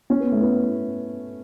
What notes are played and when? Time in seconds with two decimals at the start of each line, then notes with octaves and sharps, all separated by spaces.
0.10 C#4
0.20 B3
0.32 A3
0.42 B3